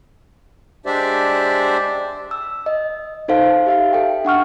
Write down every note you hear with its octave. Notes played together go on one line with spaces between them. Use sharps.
G#3 D4 G4 C5 D5 E5
E6
D#5
D#4 A4 C5 F5
G4 E5 F5
A4 G5
D4 F#5 C#6 F6